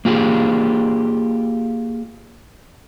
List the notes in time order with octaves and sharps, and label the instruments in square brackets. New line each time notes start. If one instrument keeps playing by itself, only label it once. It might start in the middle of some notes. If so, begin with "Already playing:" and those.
[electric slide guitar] A#3 F4 G4 G#4